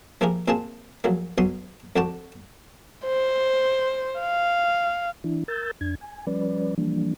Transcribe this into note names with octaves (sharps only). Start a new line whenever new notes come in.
F3 A#3 E4 G4 G#4 A#4
A#2 A#3 C4 F4 G#4 A5
A#1 F#3 A#3
B1 B2 F#3 C6 D#6
F2 D3 F#4 G5 A5 D6
C5
F5
E3 D4 E4
A#4 E6 G6 A6
F2 D4 G#6
G#5
F3 G3 C#4 B4 D5
E3 F3 G3 A#3 D4